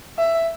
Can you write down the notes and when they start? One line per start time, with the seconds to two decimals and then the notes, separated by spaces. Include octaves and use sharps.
0.18 E5